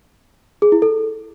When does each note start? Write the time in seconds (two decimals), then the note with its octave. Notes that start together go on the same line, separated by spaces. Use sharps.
0.62 G#4
0.72 E4
0.82 A4